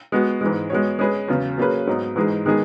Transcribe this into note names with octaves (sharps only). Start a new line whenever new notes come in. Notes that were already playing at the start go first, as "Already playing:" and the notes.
G#3 B3 F#4
G#2 E3 G#3
G#3 B3 F#4 C#5
G#3 C#4 G#4 B4
E2 C#3 F#3
F#3 A#3 C#4 G#4 B4
G#2 F#3 B3 D#4
G#2 E3 G#3 D#4 G#4
D#3 G#3 B3 D#4 G#4